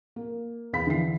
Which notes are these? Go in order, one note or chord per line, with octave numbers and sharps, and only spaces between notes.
A#3
E2 F5 B5 B6
D3 E3 C7